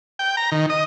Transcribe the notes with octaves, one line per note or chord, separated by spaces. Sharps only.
G5
A#5
D#3
D#5